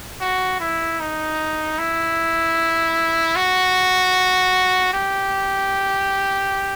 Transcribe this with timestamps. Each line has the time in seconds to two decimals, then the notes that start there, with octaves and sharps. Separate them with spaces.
0.21 F#4
0.60 E4
1.00 D#4
1.78 E4
3.36 F#4
4.93 G4